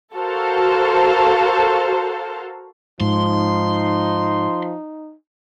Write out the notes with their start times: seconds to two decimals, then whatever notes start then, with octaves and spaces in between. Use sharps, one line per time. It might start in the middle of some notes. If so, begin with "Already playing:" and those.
0.15 F#4 A4 A#4 C5 F5
3.01 G#2 F3 D#4 C6